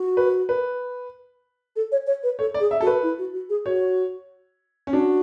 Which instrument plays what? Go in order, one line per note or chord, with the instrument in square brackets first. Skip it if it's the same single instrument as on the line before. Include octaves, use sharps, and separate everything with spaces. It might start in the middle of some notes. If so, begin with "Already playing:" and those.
Already playing: [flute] F#4
[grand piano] B4
B4
[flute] A4
C#5
C#5
B4
[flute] A4 [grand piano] C#5
[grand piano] D5
[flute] G#4
[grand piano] E5
[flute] F#4 [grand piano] A4
[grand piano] B4
[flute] E4
F#4
F#4
G#4
[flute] F#4 [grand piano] C#5
[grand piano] C#4
[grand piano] D4 [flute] F#4